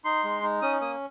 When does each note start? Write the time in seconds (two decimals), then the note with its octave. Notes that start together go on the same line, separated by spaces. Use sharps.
0.05 D#4 C6
0.24 G#3
0.43 D#4
0.62 C#4 D#6
0.81 A#3 D#6